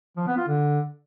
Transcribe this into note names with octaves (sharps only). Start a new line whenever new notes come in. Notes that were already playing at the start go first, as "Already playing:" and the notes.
F3
B3
F4
D3